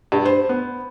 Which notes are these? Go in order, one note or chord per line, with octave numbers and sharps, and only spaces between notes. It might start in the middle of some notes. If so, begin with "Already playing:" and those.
G2
C5
B3